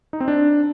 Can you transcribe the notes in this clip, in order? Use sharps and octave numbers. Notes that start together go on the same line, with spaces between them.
D#4
C4
D4